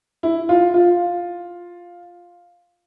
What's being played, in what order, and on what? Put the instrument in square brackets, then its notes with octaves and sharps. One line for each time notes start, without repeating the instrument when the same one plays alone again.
[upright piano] E4
F4
F4